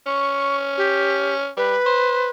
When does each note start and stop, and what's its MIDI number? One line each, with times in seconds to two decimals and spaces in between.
0.07 1.49 61
0.07 0.56 85
0.77 1.35 67
1.57 1.76 55
1.57 2.31 71
1.86 2.30 72